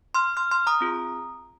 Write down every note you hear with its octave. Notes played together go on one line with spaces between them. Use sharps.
C6 F6
C6 F6
C6 F6
A#5 D#6
C4 F4 G#4